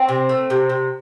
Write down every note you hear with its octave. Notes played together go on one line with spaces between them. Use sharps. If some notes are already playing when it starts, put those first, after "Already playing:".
Already playing: C4
C3
A3
C3
C3